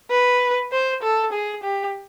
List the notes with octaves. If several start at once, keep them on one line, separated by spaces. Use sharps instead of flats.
B4
C5
A4
G#4
G4